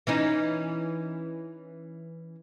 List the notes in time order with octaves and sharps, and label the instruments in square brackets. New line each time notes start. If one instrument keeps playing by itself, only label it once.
[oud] E3 C#4 D#4